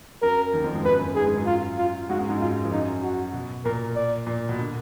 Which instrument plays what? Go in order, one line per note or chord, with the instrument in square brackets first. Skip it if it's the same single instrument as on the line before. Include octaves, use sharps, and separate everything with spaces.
[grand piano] F#2 F#3 [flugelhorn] A#4
[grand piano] D#2 D#3
F2 F3
G#2 G#3
[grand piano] F#2 F#3 [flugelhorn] B4
[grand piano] F#2 F#3
[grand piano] G#2 G#3 [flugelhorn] G#4
[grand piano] G#2 G#3
F#2 F#3
[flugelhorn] F4
F4
[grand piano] G#2 G#3 [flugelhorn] F#4
[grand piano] F#2 F#3
G#2 G#3
[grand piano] F#2 F#3 [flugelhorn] F4
[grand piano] F3
[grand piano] F#2 F#3 [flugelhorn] D#4
[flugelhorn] F#4
[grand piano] B2
[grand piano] A#2 [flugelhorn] A#4
[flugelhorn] D5
[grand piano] A#2
B2
D3